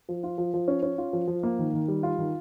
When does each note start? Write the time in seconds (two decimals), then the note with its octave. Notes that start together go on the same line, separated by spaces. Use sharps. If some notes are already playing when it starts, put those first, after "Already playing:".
0.09 F3
0.23 F4
0.38 F3
0.54 F3
0.68 C#4
0.83 C#4
0.98 F4
1.13 F3
1.28 F3
1.43 A#3
1.59 D#3
1.74 D#3
1.88 G3
2.03 F4
2.18 D#3